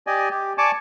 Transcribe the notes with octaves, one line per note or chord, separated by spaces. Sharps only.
G4 D5 D#5 G#5
G4
D5 G#5 A5 C#6 D6